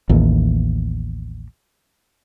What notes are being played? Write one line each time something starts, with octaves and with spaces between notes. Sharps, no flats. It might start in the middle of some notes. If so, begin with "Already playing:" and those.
A1 D#2